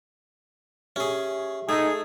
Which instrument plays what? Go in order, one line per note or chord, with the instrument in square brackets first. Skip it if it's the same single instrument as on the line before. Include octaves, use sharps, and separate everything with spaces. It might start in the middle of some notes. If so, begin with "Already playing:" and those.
[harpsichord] C#4 G#4 [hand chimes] G4 E5
[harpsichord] A3 [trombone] D#4 [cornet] G#4 [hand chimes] G#6